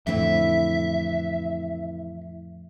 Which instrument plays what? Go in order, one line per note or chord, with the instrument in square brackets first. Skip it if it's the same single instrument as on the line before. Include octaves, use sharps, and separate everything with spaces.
[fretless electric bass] F2 A2 D3 [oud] E3 C4 E4 [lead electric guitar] E5